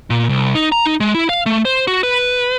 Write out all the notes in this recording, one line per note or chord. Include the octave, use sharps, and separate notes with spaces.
A#2
C2
D#4
A#5
D#4
G#3
E4
F5
A3
C5
F#4
B4